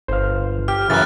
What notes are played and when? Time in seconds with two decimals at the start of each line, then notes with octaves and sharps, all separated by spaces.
0.08 G1 C5 F5
0.68 G4 F6
0.90 F#2 C#3 E3 F#6 A6